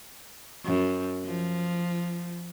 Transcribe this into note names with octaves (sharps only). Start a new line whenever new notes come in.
F#2
F3